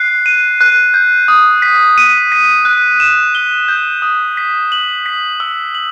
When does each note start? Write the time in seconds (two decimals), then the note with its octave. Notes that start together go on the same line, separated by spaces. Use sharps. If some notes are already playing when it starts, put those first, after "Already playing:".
Already playing: F#6 C7
0.26 D#7
0.61 F#6
0.94 G6
1.28 D#6
1.62 B6
1.98 D#7
2.32 B6
2.65 F#6
3.00 E7
3.35 G7
3.68 G6
4.02 D#6
4.37 B6
4.72 F#7
5.06 B6
5.40 E6
5.75 F#7